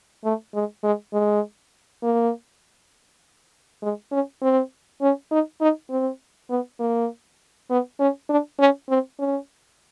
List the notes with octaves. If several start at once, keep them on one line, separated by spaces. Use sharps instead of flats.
A3
G#3
G#3
G#3
A#3
G#3
C#4
C4
C#4
D#4
D#4
C4
B3
A#3
B3
C#4
D4
C#4
C4
C#4